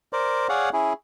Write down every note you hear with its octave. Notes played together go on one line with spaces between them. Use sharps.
A#4 C5 D5
G#4 C#5 D5 F5 F#5
C#4 E4 G#4